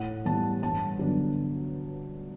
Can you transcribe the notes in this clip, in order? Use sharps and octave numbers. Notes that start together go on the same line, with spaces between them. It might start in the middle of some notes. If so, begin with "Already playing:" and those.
Already playing: A2 F#5
E3 G3 B3 A5
G2 A5
D3 F#3 B3 D4